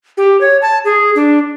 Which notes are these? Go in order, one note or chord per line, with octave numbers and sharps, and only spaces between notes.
G4
C#5
A5
G#4
D4